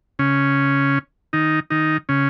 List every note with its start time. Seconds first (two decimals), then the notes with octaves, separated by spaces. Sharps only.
0.19 C#3 C#4
1.33 D#3 D#4
1.70 D#3 D#4
2.09 C#3 C#4